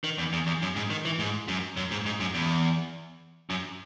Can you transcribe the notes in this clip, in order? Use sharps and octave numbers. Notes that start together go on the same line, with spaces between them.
D#3
E2
E2
E2
F#2
G#2
D#3
E3
G#2
F#2
F#2
G#2
G#2
F#2
E2
F#2